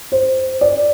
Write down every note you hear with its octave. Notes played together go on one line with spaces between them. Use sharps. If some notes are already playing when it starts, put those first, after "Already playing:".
C5
D5